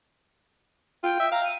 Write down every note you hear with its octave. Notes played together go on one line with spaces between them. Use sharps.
F4 G5
E5
F5 A#5
D#7